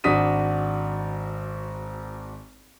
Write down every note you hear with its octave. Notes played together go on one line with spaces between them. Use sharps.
G#1 D4 F#4 D#6 B6 D#7